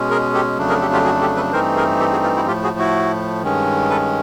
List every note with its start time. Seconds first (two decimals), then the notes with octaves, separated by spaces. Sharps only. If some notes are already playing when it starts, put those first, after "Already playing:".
Already playing: B2 G#3 C#4
0.10 G#4 A#4
0.34 G4 A4
0.58 F2 C#3 F#3 A3 D4
0.69 G#4 A#4
0.81 G4 A4
0.93 F4 G4
1.05 F#4 G#4
1.21 G4 A4
1.36 A4 B4
1.52 G2 E3 A3 C4 D#4 A#4 C5
1.76 G#4 A#4
2.00 G4 A4
2.12 F#4 G#4
2.23 F4
2.36 E4 F#4
2.47 A2 F3 A3 F4 G4
2.63 F#4 G#4
2.79 E4 F#4
3.43 G2 D#3 G#3 C#4
3.90 A4 B4